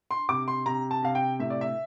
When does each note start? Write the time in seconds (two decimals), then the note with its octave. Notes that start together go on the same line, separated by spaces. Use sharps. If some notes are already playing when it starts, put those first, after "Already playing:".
0.11 C6
0.29 C3 D6
0.48 C6
0.66 C3 A#5
0.91 A5
1.03 C3 F5
1.15 G5
1.40 A2 E5
1.50 D5
1.61 E5